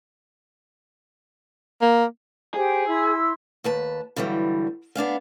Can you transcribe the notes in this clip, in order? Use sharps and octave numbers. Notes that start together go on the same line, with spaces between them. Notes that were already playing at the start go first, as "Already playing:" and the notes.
A#3
G4 G#4 C5
E4 C6 E6
D#2 B4 A5
G2 D3 E3 F#3 G3
B3 D4 G#4 F5